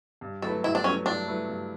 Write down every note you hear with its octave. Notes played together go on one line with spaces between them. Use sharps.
G2
F#3 A3 E4 A4 B4
G2 E4
D4
F#3 A3 C#4 E4 B4
G2 D4
F#3 A3 E4 B4
G2